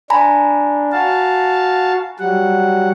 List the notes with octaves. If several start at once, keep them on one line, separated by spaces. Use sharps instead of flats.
D4 G#5 A#5 B5
F#4 F5 A5
F#3 G3 F#5